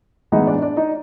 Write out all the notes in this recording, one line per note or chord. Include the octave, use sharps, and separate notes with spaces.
A2 E3 G#3 B3 D#4 E4 D#5
D4 D5
D4 D5
D#4 D#5